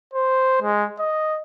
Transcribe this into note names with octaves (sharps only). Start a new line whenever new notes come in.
C5
G#3
D#5